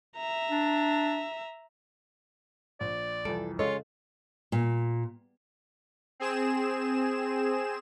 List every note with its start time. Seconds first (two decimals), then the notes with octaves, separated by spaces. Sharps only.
0.17 E5 A#5
0.50 D4
2.81 A#1 D5
3.25 C2 F2 E3 A4 D7
3.59 C#3 G#3 F4 A4 C#5 D#5
4.52 A#2
6.20 C4 G#4 E7